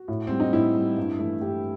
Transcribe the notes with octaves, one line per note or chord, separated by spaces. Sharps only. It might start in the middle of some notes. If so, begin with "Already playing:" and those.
Already playing: F#4
A2
G3 C4
D#4
A2 E4
G3
G2
E3 A3
G2 G4